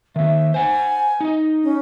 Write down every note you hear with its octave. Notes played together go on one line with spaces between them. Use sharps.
D#3 A#3 E5
C5 F#5 G#5
D#4 D#5
C#4